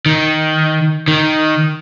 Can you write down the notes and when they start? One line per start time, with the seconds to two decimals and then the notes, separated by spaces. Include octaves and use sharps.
0.06 D#3
1.08 D#3